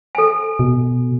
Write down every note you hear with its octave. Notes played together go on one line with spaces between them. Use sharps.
A4 G#5
B2